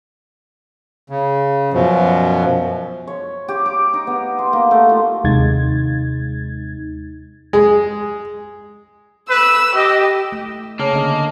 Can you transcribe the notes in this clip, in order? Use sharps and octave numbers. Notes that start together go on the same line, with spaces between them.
C#3
F#2 B2 F3
C#5
G4
D6
D#4
B3
C6
A#3
A3
F4
D#2 C3 G#3 D#4 G#6 A6
G#3
B4 E6
G4 D#5
A3
C#3 A#3 C#5 A5 F6
D3 D#5